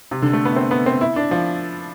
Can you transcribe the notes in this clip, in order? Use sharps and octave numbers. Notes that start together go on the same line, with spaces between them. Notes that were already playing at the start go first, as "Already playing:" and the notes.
C3
D3
A3
B3
C4
B3
C4
E4
D4
F3